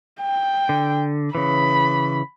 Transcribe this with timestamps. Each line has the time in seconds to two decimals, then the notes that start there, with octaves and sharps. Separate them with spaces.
0.22 G5
0.69 D3
1.35 C#3 E3 B5